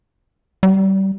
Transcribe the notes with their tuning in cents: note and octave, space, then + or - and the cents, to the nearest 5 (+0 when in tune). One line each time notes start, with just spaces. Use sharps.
G3 -25